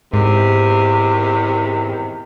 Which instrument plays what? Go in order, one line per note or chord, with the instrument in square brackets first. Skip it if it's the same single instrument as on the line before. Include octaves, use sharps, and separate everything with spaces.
[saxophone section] E2 C3 D#3 [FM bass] G#2